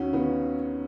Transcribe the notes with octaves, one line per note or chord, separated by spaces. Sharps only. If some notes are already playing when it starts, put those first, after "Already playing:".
Already playing: D#2 D#3 C#4 F#4
D#3 B3